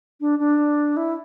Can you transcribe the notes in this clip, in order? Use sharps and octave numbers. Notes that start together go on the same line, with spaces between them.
D4
D4
E4